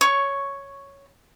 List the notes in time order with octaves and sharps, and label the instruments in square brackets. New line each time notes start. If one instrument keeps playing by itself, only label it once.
[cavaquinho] C#5 C#6